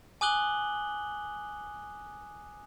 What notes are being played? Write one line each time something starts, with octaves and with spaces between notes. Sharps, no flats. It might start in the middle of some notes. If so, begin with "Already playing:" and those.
G#5 D6 D#6 F#6 F#7 G7